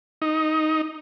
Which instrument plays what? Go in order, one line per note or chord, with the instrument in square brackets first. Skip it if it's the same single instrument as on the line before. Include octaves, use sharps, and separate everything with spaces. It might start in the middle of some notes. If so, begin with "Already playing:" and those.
[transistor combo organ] D#4